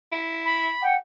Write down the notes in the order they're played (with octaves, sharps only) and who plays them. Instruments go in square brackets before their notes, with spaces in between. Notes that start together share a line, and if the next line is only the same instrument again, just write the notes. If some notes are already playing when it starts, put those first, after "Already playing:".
[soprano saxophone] E4
[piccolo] B5
[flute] F#5 [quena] G5